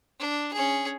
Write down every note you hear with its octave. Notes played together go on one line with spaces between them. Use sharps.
D4
C#4 G#4